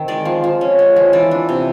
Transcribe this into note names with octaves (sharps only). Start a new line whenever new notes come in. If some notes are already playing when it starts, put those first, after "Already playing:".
Already playing: D#3 C4
G#3 D5
F3
F3
C#4
G#3
F3
E3 D5
D4
C3